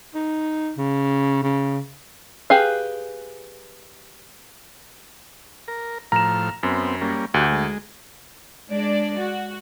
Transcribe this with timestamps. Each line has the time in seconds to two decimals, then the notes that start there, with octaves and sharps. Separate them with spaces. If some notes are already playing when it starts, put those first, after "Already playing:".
0.14 D#4
0.78 C#3
1.42 C#3
2.50 G4 G#4 B4 F5
5.68 A#4
6.12 A2 F3 A#5 F6 E7
6.63 F#2 B3 C4
7.01 G3 A#3 C#4
7.34 D2 F#4 G4
7.52 G#3
8.71 G#3 D4 D5
9.19 F#4